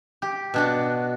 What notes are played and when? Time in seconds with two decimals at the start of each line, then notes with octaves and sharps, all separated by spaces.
0.22 G4
0.54 B2 D4 F#4